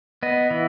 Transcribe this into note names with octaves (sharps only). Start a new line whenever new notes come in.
B3 D#5
E3